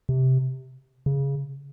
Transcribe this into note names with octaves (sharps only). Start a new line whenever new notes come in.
C3
C#3